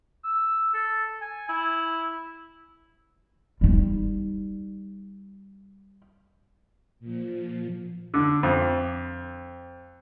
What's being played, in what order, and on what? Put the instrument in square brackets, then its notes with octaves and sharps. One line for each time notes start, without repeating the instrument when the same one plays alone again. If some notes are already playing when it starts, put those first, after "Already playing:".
[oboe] E6
A4
G#5
E4
[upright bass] G3 D#4
[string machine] A#2 F3
[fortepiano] D3
F2